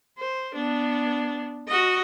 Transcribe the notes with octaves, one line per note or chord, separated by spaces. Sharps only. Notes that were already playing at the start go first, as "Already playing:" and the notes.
C5
B3 D4
F#4 D#5